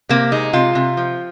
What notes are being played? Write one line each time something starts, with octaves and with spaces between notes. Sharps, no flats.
C3 A#3
G#3 D#4
C3 F4
C3
F3